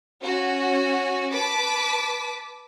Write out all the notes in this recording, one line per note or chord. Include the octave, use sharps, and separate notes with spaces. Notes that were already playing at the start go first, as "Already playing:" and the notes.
C#4 F#4
B4 A5 D6 B6